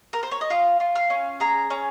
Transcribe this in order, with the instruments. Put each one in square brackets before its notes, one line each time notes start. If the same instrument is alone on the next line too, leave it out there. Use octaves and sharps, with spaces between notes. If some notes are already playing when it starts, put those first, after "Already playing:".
[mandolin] A#4
C5
C#5
D#5
F4 F5
F4
F5
C#4
G#4 A#5
C#4